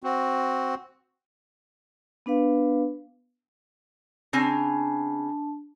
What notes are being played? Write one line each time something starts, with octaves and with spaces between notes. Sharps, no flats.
C4 F#4
B3 D4 B4 F5
C#3 C4 D4 G#5 A5